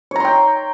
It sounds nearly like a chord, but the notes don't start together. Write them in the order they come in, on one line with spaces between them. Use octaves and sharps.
C#5 A#5 C6 G5